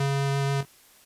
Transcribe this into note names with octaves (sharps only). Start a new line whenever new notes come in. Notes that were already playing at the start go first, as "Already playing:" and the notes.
Already playing: C#3